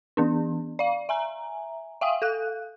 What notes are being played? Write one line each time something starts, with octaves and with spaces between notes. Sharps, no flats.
E3 B3 D4
D5 F5
E5 G#5 A#5
E5 F5 G5 G#5 D#6
A4 F5 F#6